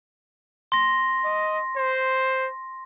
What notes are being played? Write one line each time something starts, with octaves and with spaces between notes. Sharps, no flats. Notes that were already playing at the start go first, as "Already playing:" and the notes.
C6 A#6
D#5
C5